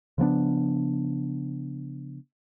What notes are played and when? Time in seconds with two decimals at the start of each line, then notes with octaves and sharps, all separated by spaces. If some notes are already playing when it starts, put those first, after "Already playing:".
0.18 C#3 F3 B3 D4